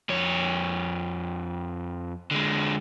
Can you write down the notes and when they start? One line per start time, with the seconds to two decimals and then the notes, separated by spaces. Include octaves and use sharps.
0.09 F2 C#5
2.31 D3 G#3